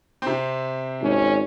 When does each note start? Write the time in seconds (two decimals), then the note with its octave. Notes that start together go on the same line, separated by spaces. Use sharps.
0.22 C3 C4
1.02 G#1 C#4